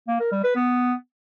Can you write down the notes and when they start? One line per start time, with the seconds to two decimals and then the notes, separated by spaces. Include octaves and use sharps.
0.08 A#3
0.20 A#4
0.32 G3
0.44 B4
0.55 B3